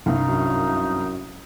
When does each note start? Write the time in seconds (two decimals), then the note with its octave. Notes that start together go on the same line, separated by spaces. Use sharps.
0.06 C2 G2 D#4
0.29 F#2